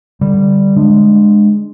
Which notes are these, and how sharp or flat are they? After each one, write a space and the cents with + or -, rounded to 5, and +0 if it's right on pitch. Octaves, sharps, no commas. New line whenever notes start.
D3 +15 G3 +0
G#3 +0 D4 +25